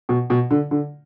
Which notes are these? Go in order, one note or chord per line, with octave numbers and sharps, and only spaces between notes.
B2
B2
D3
D3